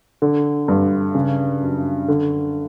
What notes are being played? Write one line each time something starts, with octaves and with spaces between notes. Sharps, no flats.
D3
G2
C#3
F#2
D3